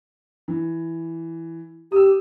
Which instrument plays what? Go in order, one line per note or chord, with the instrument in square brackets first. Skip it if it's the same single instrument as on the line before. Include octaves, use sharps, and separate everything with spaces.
[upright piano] E3
[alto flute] G4 [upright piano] D#6 E6